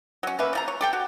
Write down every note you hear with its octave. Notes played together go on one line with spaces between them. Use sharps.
F#3 C#4
A#3 C#4 B4 E5
C#3 F3 A#5
C#5
G4 A4 G5
F#4